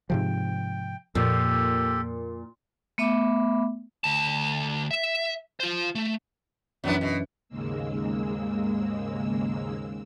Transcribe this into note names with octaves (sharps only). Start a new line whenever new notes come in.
G#2 C3 F3 G5
F2 A#2 G4 A4
A3 B3 E5 B5 D6
D2 A5
E5
F4 C5
A3
F#2 E3 F#3 B3 D4
B2
D#2 G#2 C#3 G#3 A#3 E6